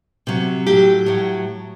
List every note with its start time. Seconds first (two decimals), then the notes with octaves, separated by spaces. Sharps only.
0.27 C3 F#3
0.66 A2 F#3 G4
1.06 A2 F#3